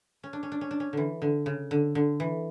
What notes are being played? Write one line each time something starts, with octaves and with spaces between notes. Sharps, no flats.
C#4
D4
C#4
D4
C#4
D4
C#4
D3 E3
D3
C#3
D3
D3
E3